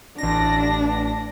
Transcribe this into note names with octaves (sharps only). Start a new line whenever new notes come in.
A1 D4 A#6